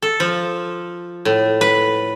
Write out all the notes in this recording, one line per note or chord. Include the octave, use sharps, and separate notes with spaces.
A4
F3
A2
B4